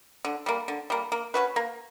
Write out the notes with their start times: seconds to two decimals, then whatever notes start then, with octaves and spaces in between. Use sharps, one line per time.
0.25 D3
0.46 G3 A#3
0.68 D3
0.90 G3 A#3
1.12 A#3
1.34 C#4 F#4 B4
1.56 A#3